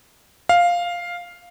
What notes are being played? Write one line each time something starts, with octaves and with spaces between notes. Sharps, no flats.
F5